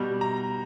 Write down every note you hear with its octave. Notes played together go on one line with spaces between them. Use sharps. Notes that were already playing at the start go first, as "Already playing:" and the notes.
Already playing: B2 G3
A#5